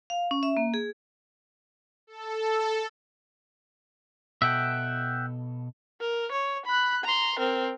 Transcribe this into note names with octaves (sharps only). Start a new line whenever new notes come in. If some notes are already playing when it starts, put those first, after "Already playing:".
F5
C#4
E5
A#3
G#4
A4
B2 A4 E5 F#5 G5
A#4
C#5
B5 F#6
A#5 C6
C4 A#4